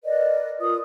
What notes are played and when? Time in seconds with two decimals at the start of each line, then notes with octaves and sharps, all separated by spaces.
0.03 A#4 B4 D5 D#5
0.60 F4 A#4 D#6